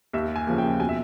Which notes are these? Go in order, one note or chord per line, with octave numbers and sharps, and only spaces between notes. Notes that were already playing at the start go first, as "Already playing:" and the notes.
D#2 E5
G#5
C#3 F3 A#3
G5
B2 G#5
E5